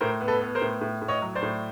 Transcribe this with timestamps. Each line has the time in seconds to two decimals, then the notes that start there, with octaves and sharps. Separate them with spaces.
0.01 A2 A#4 C5
0.21 B3
0.28 A4 B4
0.41 B3
0.55 A#4 C5
0.61 A2
0.81 A2
1.02 A2
1.08 C#5 D#5
1.22 F#3
1.35 C5 D5
1.42 A2